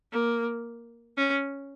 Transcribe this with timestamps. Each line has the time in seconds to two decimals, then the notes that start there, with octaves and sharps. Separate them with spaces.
0.12 A#3
1.17 C#4